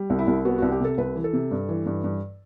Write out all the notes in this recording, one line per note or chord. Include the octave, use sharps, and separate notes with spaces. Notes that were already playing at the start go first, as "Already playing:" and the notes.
Already playing: G3
C2
E4
C2
B3 F#4
C2 F#4
G4
C3 A4
C2 B4
E3
A4
C3
G2
E3
G2
G2